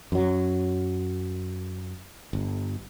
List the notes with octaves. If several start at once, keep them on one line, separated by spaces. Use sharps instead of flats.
F#2 F#3
G1